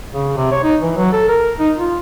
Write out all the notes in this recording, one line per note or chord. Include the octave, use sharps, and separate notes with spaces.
C#3
C3
C#5
D#4
E3
F#3
A4
A#4
D#4
F4